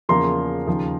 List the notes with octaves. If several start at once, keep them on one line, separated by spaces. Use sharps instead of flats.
E2 C#3 F3 A#3 A#5 C6
D#2 C#3 F3